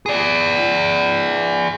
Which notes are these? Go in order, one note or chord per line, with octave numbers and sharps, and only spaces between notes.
G#4 D5